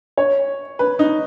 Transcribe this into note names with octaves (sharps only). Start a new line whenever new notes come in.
C#5
B4
D#4